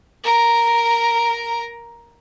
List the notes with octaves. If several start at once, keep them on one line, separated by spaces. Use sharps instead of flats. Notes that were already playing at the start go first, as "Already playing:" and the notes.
A#4 A#5